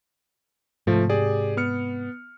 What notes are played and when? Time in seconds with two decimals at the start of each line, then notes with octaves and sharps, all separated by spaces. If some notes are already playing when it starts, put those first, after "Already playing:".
0.87 G#2 C3 F3 A3
1.09 G4 G#4 D5
1.57 B3 F6 C#7